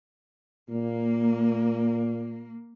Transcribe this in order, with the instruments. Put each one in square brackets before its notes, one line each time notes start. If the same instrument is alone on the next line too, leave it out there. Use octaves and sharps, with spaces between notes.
[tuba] A#2 [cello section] A#3